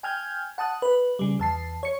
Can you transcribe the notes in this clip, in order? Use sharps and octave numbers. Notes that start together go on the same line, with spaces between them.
G5 G#5 F6 G6 G#6
F#5 A5 D#6 F#6
B4
C#3 G3
E2 A5 C7
C#5 C#7